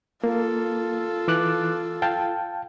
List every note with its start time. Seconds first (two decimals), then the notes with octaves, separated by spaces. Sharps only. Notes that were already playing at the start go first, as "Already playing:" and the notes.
0.24 A#3 F4 A4
1.28 E3 D6 F#6
2.02 F5 G5 A5